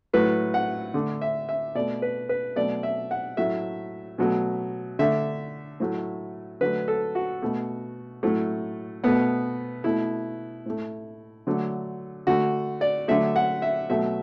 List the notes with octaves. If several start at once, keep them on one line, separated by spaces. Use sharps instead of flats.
A2 F#3 A3 B4
F#5
D3 A3
E5
E5
B2 A3 D5
B4
B4
B2 F#3 A3 D5
E5
F#5
A2 F#3 A3 E5
B2 F#3 A3
D3 A3 E5
A2 F#3 A3
D3 F#3 A3 B4
A4
F#4
B2 A3
A2 F#3 A3
B2 A3 B3
B2 A3 E4
A2 A3
D3 F#3 A3
D3 A3 F#4
D5
D3 F#3 A3 E5
F#5
E5
B2 F#3 A3 E5